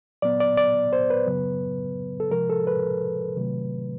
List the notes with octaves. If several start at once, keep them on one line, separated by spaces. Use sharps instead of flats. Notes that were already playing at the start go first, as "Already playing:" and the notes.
A#2 F#3 B3 D5
D5
D5
C5
B4
F#2 C#3 F#3 B3
A4
C3 F3 G#3 A#4
A4
B4
C3 D#3 F#3 A3